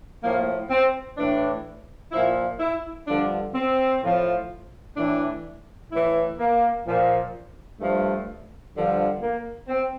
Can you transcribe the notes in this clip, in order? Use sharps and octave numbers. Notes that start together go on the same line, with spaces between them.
A2 F3 A#3
C4
A2 E3 D4
A#2 F3 E4
E4
G2 D3 F3 D4
C4
A2 F3
A2 E3 D4
A2 E3 E4
A#3
A#2 F3
G2 F3 A3
G2 D3 F3
A#3
C4